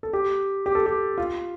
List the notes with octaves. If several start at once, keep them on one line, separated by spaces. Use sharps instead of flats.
A4
G4
G4
A4
G4
F4